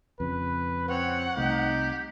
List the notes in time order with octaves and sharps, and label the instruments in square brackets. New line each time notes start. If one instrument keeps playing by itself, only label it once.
[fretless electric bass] F2 C#3 [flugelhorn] B4
[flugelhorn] C4 [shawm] C#5 [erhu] F#5
[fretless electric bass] C2 C3 A3 [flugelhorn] D#4 [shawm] G4